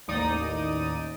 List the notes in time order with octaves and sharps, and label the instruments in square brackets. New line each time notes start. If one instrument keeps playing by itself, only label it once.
[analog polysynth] A1 D#2 D#4 D5 D#6